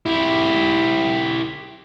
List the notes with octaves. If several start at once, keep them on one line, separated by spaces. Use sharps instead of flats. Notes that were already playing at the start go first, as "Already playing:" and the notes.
E4 G4